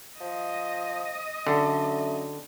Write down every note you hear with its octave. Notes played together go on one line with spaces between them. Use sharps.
F3 D#5
F#2 D3 A3